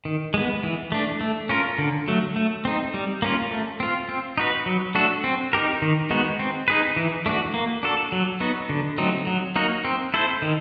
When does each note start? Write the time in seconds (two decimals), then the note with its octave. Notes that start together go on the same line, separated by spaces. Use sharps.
0.05 D#3
0.34 G#3 B3
0.63 E3
0.92 A3 D4
1.21 A3
1.49 C#4 F4 A#4
1.78 D3
2.08 F#3 A3
2.36 A3
2.65 C4 D#4
2.94 G3
3.22 A#3 C#4 F4
3.51 A3
3.80 C4 F4
4.09 C4
4.38 D#4 F#4 B4
4.66 F#3
4.95 A3 D4 F#4 A4
5.24 C4
5.53 D#4 G4 A#4
5.82 D#3
6.10 G#3 B3 D#4 F#4
6.39 C4
6.68 D#4 G#4 B4
6.96 E3
7.26 A3 D4 F#4
7.54 A#3
7.83 D4 F#4 A4
8.12 F#3
8.40 B3 D#4 F#4
8.69 D3
8.98 F#3 A3 C4 D#4
9.27 F#3
9.56 A#3 D#4 F#4 A#4
9.85 C4
10.14 E4 A4 C5
10.42 D#3